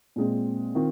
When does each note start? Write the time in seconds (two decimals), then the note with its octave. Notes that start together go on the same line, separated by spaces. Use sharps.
0.16 A#2 G#3 C4
0.75 D#3 C4 F4